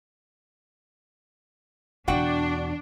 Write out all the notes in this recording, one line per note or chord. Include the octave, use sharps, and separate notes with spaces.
E2 B2 D4 F#4 F#5 G5